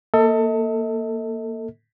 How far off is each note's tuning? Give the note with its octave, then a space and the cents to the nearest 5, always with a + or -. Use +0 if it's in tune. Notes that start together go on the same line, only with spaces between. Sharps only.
A#3 +0 A4 +25 D#5 +45